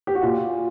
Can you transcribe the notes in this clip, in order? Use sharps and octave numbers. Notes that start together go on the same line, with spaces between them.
G4
F#4
A#2 F4